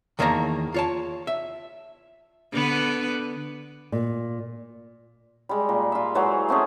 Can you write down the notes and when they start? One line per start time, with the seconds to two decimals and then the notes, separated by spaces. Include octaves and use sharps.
0.19 E2 D#3 A#3 C#5 A5 A#5
0.74 F4 C#5 A5
1.27 E5
2.53 D3 B3 B4
3.92 A#2
5.49 G3 G#3
5.69 A#2 A#3
5.92 F4 E5
6.15 E3 F#3 G#3 C5
6.49 A3 C4 C#4 G#4